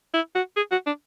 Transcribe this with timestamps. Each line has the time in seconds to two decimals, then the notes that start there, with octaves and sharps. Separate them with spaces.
0.14 E4
0.35 F#4
0.56 G#4
0.71 F#4
0.86 D4